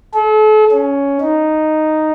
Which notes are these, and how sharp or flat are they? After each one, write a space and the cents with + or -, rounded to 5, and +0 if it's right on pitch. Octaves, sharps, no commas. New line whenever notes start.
A4 -40
C#4 +10
D#4 -5